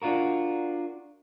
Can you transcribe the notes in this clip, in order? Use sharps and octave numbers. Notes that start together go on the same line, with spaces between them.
D4 F4 F#4 A#4